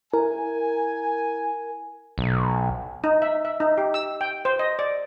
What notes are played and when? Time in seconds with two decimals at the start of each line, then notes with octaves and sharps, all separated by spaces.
0.14 E4 A#4 G#5
2.18 B1
3.04 D#4
3.22 E5
3.45 E5
3.60 D#4
3.78 G4
3.94 E6
4.21 G5
4.45 C5
4.59 D#5
4.79 D5